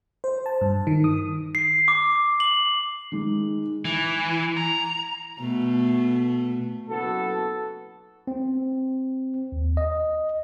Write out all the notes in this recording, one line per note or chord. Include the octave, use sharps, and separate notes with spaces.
C5
A5
G2
D#3
D#6
C7
D6
F#7
D#3 G#3
E3
A#5
B2 A3
F#1 B3 F#4 A4
C4
D#2
D#5